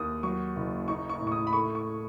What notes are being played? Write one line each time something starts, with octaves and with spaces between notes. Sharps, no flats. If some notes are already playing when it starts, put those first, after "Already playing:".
Already playing: D#2 D#6
F#3 C#6
F#1
D#4 C#6
C#6
A2
C#6
D#6
B5
A3 C#6
C#6